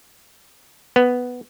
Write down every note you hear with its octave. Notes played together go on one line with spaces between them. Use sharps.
B3